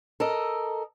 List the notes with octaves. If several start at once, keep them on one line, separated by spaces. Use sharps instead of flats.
A4 A#4 D#5